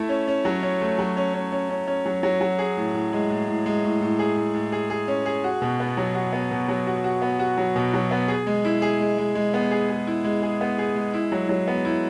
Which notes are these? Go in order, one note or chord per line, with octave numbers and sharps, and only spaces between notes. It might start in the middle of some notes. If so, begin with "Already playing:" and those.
Already playing: A3 E4
C#4
C#4
F#3
C#4
A3
F#3
C#4
C#4
C#4
C#4
C#4
F#3
F#3
F#3
G#4
A2
A2
G#3
A2
A2
G#3
A2
A2
G#4
A2
A2
G#4
G#4
C#4
G#4
F#4
B2
B3
F#3
F#4
B3
B2
F#3
F#4
F#4
B3
F#4
F#3
B2
F#3
B3
G#4
G#3
E4
G#4
G#3
G#3
G#3
B3
G#4
G#4
E4
G#3
G#4
B3
G#4
G#3
E4
F#3
F#3
B3
E4